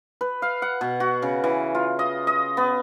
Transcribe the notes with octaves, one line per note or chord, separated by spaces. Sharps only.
B4
F5
F#5
B2
F#4
C#3
E3
F4
D#5
D#5
B3